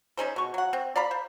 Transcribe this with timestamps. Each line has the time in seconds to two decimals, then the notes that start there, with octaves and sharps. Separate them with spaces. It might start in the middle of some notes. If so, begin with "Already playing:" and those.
0.17 C#4 D#4 G#4 C5
0.36 B2 C#6
0.54 F#3 F#5
0.73 C4
0.96 D5 F5 A#5 B5
1.11 C5